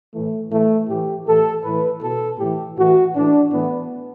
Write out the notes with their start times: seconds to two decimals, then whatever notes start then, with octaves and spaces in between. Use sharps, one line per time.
0.14 A2 E3 A3
0.51 A2 E3 A3
0.88 A2 E3 G4
1.26 A2 E3 A4
1.63 A2 E3 B4
2.02 B2 A4
2.39 A2 E3 G4
2.76 A2 E3 F#4
3.15 A2 E3 D4
3.52 A2 E3 B3